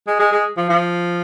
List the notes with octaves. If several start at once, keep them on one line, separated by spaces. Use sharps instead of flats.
G#3
G#3
G#3
F3
F3